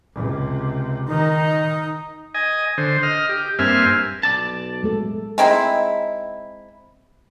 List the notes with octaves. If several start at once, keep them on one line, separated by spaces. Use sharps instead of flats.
C#2 C3
D#3 D#4
D#5 G#5
D3 C5
D#5 F6
G4
G2 A#3 C4 E5 G#5 F6
B1 D5 A5
G#3 A3 A4
G#3 C4 D#4 E4